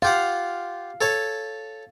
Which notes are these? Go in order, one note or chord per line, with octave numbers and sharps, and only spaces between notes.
F4 G4 F5 F#5
A4 C#5 A5